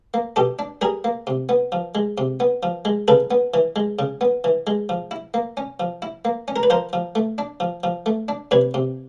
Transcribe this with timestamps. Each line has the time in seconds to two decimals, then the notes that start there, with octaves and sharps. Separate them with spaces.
0.14 A#3
0.36 B2 G4 A4
0.59 D4
0.81 G3 G#4 A#4
1.04 A#3
1.27 C3
1.49 B3
1.72 F3
1.95 G#3
2.18 C3
2.40 B3
2.63 F3
2.85 G#3
3.08 C#3 A4 B4
3.31 B3
3.54 E3
3.76 G#3
3.99 C#3
4.21 B3
4.44 E3
4.67 G#3
4.89 F3
5.11 E4
5.34 A#3
5.57 C#4
5.80 F3
6.02 E4
6.25 A#3
6.48 C#4
6.56 A#4
6.63 B4
6.70 F3 A#4 C5
6.93 F3
7.15 A3
7.38 D4
7.60 F3
7.84 F3
8.06 A3
8.28 D4
8.51 C3 B4 C#5
8.74 C3